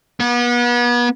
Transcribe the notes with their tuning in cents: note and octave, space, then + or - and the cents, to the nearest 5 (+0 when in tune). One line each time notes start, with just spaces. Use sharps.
B3 -35